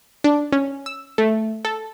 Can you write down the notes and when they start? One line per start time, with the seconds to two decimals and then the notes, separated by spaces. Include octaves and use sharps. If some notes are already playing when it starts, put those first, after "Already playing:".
0.24 D4
0.52 C#4
0.86 E6
1.18 A3
1.65 A4